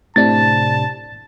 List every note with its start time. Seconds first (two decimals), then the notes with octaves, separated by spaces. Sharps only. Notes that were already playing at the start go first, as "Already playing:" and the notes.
0.16 A2 C3 D4 A5 A6